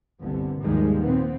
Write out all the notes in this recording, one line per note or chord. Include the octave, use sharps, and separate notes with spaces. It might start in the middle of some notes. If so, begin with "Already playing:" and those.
G1 C2 D3 B3
D#2 G#2 D#3 F3 G3 G#3
A#2 B3 C4